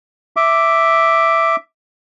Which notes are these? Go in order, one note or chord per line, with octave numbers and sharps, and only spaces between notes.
E5 D6